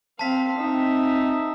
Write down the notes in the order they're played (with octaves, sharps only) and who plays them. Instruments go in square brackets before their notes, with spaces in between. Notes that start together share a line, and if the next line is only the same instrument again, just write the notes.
[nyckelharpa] C4 F5 [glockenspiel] A5 B6
[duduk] C4 [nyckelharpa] D#4 E5